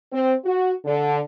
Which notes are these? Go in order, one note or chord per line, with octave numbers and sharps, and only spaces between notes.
C4
F#4
D3